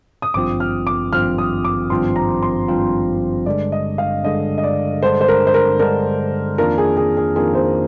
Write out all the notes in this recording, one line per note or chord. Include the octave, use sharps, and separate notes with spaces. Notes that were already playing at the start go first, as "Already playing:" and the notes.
D#6
G#1 G2 F3 C4 F4 D6
F6
D6
G#1 G2 F3 C4 F4 F6
D#6
D6
G#1 G2 F3 C4 F4 C6
A#5
C6
G#1 G2 F3 C4 F4
G2 D3 G#3 D4 D5
D#5
F5
G2 D3 G#3 D4 D#5
D#5
D5
G2 D3 G#3 D4 C5
C5
A#4
C5
A#4
G2 D3 G#3 D4 A#4
F2 D#3 A#3 D4 F4 A#4
G#4
G#4
G#4
F2 D#3 A#3 D4 F4 G#4
C5